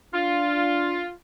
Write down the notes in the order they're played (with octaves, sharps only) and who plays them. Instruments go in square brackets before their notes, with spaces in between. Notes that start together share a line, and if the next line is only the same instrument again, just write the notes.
[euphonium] D4 [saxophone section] F4